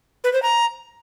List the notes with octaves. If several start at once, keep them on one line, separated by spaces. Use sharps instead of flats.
B4
C5
A#5